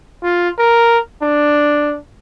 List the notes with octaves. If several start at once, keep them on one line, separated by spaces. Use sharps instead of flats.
F4
A#4
D4